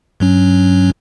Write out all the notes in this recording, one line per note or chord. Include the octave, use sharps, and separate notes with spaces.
G2 F#3 C#4